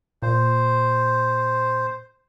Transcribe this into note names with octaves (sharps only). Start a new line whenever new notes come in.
A#2 C5